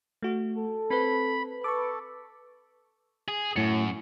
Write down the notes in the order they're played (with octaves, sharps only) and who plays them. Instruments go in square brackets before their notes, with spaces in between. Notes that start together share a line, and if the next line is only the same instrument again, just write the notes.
[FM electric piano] A3 F#4
[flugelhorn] A4
[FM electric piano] C4 B4 [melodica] B5
[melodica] A4 [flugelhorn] B4 [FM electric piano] C#6 D6
[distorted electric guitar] G#4
[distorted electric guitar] F#2 [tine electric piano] A2 C#7